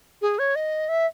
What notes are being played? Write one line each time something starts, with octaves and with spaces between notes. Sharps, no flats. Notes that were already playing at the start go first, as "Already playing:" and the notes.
G#4
C#5
D#5
E5